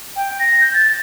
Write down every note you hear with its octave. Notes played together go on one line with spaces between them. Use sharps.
G5
A#6
G6
A6